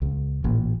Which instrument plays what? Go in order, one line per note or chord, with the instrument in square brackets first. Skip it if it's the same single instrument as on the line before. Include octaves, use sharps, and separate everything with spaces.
[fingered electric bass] C#2
A1 A#2